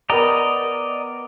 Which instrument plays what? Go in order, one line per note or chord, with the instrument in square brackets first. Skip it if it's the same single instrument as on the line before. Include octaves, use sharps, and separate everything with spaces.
[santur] B3 A#4 G5 [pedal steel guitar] D5 D#5 A#5